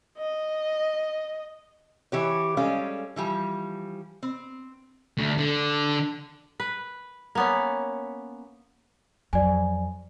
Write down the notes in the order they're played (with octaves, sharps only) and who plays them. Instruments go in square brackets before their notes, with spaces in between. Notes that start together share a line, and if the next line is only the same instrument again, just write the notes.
[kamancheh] D#5
[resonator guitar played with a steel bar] E3 G4 C#5
G3 G#3 C#4 A4 F5
E3 F3 G3
C4
[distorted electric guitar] D2
D3
[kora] B4
A#3 B3 C#4
[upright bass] F2 F#3 [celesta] D5 G#5